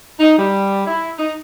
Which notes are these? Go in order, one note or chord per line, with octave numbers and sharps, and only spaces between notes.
D#4
G3
E4
D#4